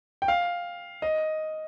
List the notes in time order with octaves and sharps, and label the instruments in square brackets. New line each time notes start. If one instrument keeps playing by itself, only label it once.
[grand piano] G5
F5
D#5